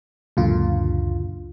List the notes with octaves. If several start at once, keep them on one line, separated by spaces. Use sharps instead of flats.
C#2 F#2 A#2 D3 F4